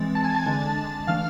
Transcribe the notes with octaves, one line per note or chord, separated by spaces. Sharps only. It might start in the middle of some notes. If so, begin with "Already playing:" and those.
Already playing: E3 G#3 C4 A6
A5 A6
G#5 G#6
A5 A6
D3 G#3 D4
E3 A3 D4 F5 F6